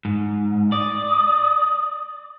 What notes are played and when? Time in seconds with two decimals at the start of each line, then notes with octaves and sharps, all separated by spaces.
0.05 G#2
0.72 D5 D#6